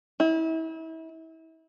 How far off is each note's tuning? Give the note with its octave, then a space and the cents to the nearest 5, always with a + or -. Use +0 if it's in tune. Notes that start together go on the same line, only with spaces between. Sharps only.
E4 -35